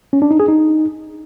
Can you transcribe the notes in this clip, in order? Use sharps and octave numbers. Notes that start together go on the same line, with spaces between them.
C#4
D4
D#4
G#4
D#4